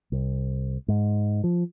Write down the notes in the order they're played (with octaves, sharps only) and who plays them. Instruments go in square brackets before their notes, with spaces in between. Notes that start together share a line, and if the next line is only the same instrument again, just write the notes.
[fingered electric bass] C2
G#2
F3